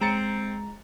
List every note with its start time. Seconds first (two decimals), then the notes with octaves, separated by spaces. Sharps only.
0.01 G#3 C4 A#5 A6 C#7